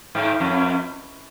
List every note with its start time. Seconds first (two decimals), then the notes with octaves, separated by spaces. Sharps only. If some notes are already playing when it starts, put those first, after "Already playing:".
0.15 G#2
0.40 F2